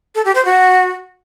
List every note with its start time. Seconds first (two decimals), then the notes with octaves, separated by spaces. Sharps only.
0.15 A4
0.25 G4
0.35 C5
0.45 F#4